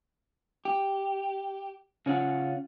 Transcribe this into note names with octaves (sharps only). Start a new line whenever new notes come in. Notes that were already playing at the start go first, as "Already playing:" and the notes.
G4
C#3 C#4 F4 F#5